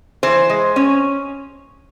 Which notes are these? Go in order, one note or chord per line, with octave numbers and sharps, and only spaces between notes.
E3 C5
G#3
C#4